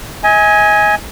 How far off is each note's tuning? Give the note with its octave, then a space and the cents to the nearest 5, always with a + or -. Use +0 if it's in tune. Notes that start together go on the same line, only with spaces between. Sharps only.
D#5 +40 G#5 +0